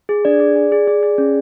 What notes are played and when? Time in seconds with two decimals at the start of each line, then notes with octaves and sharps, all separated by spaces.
0.09 G#4
0.25 D4 D5
0.40 G#4
0.56 G#4
0.72 G#4
0.87 G#4
1.03 G#4
1.18 C#4